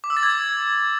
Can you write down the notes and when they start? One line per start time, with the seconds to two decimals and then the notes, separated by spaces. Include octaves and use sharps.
0.04 D6
0.10 E6
0.17 A6
0.23 G#6